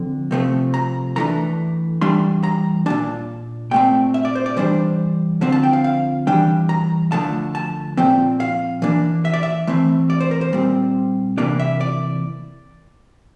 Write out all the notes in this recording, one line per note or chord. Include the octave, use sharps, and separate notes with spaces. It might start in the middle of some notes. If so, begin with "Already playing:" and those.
Already playing: D3 F3 C4
C3 F3 A3 C4
A#5
E3 A3 D4 A#5
E3 G3 D4 C6
A#5
A#2 A3 D4 A5
A#2 A3 C4 G5
E5
D5
C5
D5
E3 G3 D4 C5
D3 F3 C4 C5
A5
G5
F5
F5
E3 G3 D4 G5
A#5
D3 F3 A3 A5
A5
A#2 F3 C4 G5
F5
E3 A#3 D4
E5
D5
E5
E3 A3 C4
D5
C5
A#4
C5
A#2 G3 C4
C3 E3 A#3 D4 D5
E5
D5